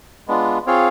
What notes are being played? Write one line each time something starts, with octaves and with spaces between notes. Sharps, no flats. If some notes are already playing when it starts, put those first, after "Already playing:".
G#3 B3 D4 F4
C4 F4 G#4 C#5 F5